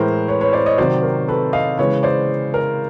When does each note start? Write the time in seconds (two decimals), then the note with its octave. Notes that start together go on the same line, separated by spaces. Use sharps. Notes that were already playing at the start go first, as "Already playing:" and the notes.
Already playing: A2 E3 G#3 A#4 C5
0.28 B4 C#5
0.41 B4 C#5
0.53 C5 D5
0.66 C#5 D#5
0.78 C3 D#3 F#3 C5 D5
1.02 A#4
1.28 A4 B4
1.53 D#5 F5
1.78 C#3 E3 G#3 B4 C#5
2.03 C5 D5
2.54 A#4